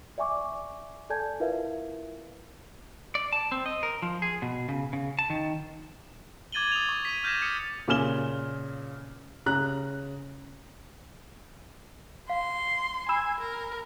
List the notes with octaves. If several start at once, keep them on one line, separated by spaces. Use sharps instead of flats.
D5 E5 G#5 C#6 D6
A4 D5 G#5 A5 G6 G#6
E4 F4 A#4 B4 E5 F5
D5
A5
C4
D#5
A#4
F3
G#4
B2
C#3
C#3
A5
D#3
D6 G#6 A6 D#7 F#7 G7
D#6 G#6 F7
C#6
B6 D#7
F6 G6 G#6 A#6 B6 E7
D#6 A6 B6 C#7
A#2 C#3 G#5 F6 E7 G7
C#3 A#5 F#6
F5 C6
G#5 B5 E6 E7
A#4